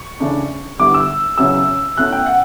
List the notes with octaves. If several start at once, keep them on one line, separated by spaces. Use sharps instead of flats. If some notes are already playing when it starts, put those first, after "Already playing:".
Already playing: C#6
C#3 E3 A3 D4
D3 G3 B3 E4 D6
E6
E2 C#3 F#3 C#4 E4 E6
B2 A3 C#4 E4 F#6
G5
F#5